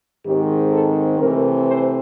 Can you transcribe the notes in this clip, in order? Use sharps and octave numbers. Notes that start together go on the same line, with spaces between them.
G#2 D#3 G#3 C4 G4
A4
C3 E3 A3 C4 A#4
C5